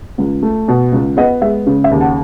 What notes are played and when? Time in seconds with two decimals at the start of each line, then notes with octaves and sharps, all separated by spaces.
0.18 C#2
0.43 A3
0.68 B2
0.92 C#2
1.17 B3 D#5 F#5
1.42 G#3 E5
1.67 C#3
1.84 E5
1.91 D#2
2.01 F#5 A5